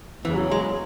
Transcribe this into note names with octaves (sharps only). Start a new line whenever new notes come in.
E2 C#3 E3 F#3
G#3